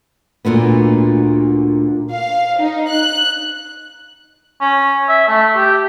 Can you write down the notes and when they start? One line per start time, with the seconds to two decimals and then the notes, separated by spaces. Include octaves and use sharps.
0.45 D2 A#2 D3 B3
2.11 F5
2.60 D#4
2.90 F#6
4.61 C#4
5.09 E5
5.28 A3
5.56 G4